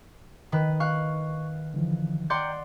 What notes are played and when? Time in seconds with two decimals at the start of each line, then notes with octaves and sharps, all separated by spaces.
0.52 D#3 B4
0.80 F5 C#6 F#6
1.74 D3 E3 F3
2.30 D5 F#5 G5 A#5 C6 G6